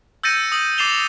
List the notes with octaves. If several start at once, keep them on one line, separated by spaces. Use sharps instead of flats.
E6 G6 A6 A#6 C#7 D#7
D#6 F#7
D6 A6 C7 E7 F7 G7